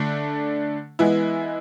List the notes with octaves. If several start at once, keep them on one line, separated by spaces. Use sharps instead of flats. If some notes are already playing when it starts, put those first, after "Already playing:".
Already playing: D3 A3 D4
E3 G#3 B3 E4